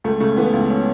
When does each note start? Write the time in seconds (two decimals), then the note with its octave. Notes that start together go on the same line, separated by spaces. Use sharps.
0.04 C#2 A3
0.20 C#3 A3
0.37 E3 B3
0.54 C#2
0.70 C#4